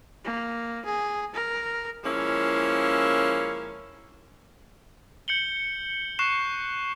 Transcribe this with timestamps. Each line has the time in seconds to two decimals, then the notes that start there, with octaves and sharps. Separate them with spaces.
0.25 A#3
0.85 G#4
1.34 A#4
2.04 F3 G#3 A#3 C#4 E4
5.28 G6 C#7 F#7 G7
6.19 C#6 F#6 C7 E7